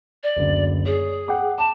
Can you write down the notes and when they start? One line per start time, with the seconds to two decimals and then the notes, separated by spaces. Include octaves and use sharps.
0.23 D5
0.36 F#1 D2
0.86 G#4 C#5
1.28 F#5 G5 D6
1.58 A5 D6